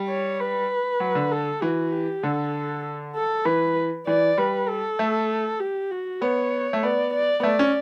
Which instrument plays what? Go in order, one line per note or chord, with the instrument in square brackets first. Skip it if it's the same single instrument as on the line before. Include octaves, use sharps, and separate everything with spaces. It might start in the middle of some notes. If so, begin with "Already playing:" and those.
Already playing: [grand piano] G3
[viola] C#5
B4
[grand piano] F#3
D3
[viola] A4
[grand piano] E3 [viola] F#4
[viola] G4
[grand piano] D3 [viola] A4
[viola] A4
[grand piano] E3 [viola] B4
[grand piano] E3 [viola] D5
[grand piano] G3 [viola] B4
[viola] A4
[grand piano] A3
[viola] G4
F#4
[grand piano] B3 [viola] C#5
[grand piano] A3
[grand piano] B3 [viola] D5
[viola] D5
[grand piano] B3
[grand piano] A3 [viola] D5
[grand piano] C#4